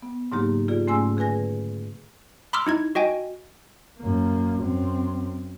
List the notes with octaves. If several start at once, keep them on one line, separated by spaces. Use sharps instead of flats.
B3
G#2 C#3 F#3 A#3 D#4 G4
F4 G#4 D5
G#2 A3 C#4 G#5 C6 E6
D3 G#4 B4 G#5 A#6
B5 C6 D6 E6 F6
D#4 E4 G#6
F#4 D#5 G5 G#5
F#2 A#3
F#2 C4